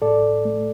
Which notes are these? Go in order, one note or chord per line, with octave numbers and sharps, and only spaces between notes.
A2 A4 D5
A3